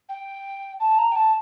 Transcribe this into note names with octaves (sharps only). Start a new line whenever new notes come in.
G5
A5
A#5
G5
A5